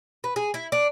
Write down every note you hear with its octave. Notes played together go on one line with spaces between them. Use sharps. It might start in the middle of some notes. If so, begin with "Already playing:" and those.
B4
G#4
E4
D4